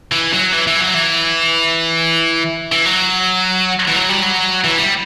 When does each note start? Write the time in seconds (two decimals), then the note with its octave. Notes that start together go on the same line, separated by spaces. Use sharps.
0.12 E3
0.33 F#3
0.52 E3
0.67 E3
0.81 F#3
0.94 E3
2.72 E3
2.86 F#3
3.88 E3
3.96 F#3
4.09 G3
4.22 F#3
4.64 E3
4.78 G3